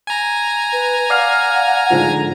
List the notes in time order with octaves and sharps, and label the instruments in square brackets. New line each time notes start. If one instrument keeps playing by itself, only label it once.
[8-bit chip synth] G#5 A#5
[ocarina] B4
[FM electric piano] D5 F5 F6 [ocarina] F#5
[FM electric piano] G#2 D3 F3